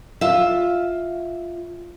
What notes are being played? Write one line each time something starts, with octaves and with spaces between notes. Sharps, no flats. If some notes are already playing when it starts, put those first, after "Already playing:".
F4 E5